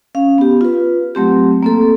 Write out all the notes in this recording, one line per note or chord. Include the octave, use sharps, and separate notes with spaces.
C#4 F5
B3 G4
F4 B4
F#3 A3 C4 G4
A#3 C4 A4